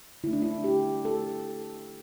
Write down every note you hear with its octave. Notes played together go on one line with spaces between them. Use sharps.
D3 A3 E4
D4
E4
G4
A4